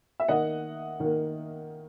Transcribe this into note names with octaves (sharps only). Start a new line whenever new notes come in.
E5
D#3 A#3 D#5 F#5
D#3 A#3